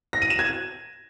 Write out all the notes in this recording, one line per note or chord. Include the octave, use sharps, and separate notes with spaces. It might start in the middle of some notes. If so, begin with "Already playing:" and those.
A#6
D#7
E7
G#6